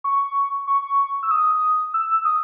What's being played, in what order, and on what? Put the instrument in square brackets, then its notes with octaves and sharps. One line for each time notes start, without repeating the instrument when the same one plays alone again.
[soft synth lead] C#6
C#6
E6
D#6
E6
D#6